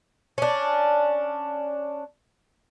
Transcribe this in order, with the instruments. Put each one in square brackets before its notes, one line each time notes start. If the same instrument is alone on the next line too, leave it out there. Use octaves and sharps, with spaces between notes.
[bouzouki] C#4 D4